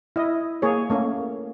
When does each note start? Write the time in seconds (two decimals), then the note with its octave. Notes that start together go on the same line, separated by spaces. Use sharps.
0.16 E4 D#5
0.62 A#3 G#4 C#5
0.90 A3 A#3 C#4